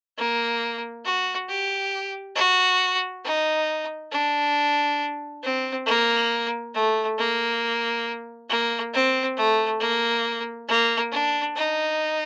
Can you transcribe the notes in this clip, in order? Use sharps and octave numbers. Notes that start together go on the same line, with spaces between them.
A#3
F#4
G4
F#4
D#4
D4
C4
A#3
A3
A#3
A#3
C4
A3
A#3
A#3
D4
D#4